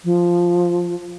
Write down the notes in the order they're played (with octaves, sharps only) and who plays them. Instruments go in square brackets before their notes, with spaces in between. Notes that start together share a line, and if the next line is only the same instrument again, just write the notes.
[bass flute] F3